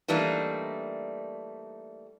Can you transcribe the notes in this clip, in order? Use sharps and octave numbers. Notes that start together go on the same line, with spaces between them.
E3 G3 A3 A#3 D4 D#4